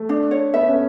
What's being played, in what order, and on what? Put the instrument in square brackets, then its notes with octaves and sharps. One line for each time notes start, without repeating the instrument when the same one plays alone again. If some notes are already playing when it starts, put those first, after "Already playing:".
Already playing: [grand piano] A3
[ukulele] D4
C#5
[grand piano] B3 [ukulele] E5
[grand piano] C#4